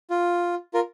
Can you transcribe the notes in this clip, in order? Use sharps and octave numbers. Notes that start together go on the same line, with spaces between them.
F4
F4 A#4